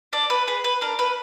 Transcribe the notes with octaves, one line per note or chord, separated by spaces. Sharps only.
D4 D5
B4
G#4 B4
B4
D4 A#4
B4